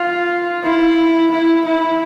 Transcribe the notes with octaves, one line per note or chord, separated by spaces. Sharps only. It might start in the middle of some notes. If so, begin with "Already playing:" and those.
Already playing: F4
E4
E4
E4